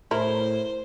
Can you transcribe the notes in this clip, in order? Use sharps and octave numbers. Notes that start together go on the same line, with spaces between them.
A2 E4 A#4 C5